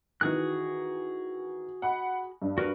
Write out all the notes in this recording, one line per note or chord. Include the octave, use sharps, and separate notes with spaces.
D#3 E3 F#4 G#4 F#6
F#5 B5
G2
F#4 A#4 B4